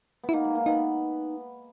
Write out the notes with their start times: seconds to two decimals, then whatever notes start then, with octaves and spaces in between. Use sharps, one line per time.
0.23 B3
0.29 E4
0.33 A#3 D#4
0.45 G#3
0.55 A#3
0.66 B3 D#4